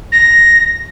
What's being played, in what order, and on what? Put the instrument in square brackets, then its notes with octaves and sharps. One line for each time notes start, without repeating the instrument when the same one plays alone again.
[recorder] A#6